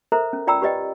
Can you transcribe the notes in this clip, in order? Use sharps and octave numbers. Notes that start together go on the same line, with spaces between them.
A4 A#4 C5 E5 A#5
C#4
F4 D5 G5 A#5 B5 E6
G4 B4 D5 D#5 G5